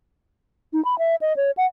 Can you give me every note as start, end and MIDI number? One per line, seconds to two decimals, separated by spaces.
0.73 0.83 63
0.85 0.99 83
0.99 1.16 76
1.21 1.36 75
1.36 1.51 73
1.57 1.66 78